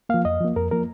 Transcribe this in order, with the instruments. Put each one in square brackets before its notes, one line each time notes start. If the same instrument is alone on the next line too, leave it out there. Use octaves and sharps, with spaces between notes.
[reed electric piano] F3 A#3 F5
F2 D#5
F3 A#3
F2 A#4
F3 A#3 A#4